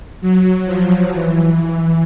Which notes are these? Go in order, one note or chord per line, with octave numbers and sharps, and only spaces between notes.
F#3
F3
E3